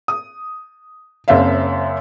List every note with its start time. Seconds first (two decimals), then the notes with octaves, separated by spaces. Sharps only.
0.08 D#6
1.28 F#1 F#2 C4 E5 F5